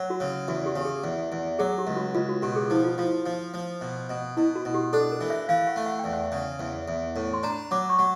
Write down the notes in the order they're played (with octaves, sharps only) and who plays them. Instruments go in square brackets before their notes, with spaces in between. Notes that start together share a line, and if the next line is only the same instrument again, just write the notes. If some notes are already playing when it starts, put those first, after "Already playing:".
Already playing: [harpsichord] F#3
[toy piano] F#4
[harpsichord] C#3
[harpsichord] E2 [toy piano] F#4
[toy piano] G4
[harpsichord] C#3
[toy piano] G4
G#4
[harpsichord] E2
E2
[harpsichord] F#3 [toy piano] G#4
[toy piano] G4
[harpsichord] C#2
[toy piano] F#4
[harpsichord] C#2 [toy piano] F4
[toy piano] F#4
[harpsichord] B2 [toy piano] G4
[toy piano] G#4
[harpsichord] F3 [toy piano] E4
[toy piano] F4
[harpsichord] F3 [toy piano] F4
[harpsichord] F3
F3
B2
B2
[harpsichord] B2 [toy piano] E4
[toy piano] F#4
[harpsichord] B2
[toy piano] G4
[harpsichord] D4 [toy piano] A4
[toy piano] A#4
[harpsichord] E3
[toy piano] E5
[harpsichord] E3 [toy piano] F5
[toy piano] F#5
[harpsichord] A3
[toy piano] F#5
[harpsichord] E2 [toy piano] G5
[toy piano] F#5
[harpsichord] C#3
E2
E2
A2
[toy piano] C6
[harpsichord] D4 [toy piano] A#5
[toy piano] B5
[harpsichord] F#3 [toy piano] D6
[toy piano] C#6
[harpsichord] F#3